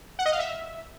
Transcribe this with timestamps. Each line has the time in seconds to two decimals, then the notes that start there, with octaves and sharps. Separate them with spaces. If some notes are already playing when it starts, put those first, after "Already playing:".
0.19 F#5
0.26 D#5
0.32 F5
0.39 E5